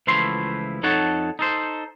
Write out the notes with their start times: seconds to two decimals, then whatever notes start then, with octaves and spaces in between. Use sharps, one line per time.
0.07 C#2 E3 F3 A3 E4 C6
0.83 F2 D#4 A4 C#5 F#5 A5
1.39 D#4 A4 C5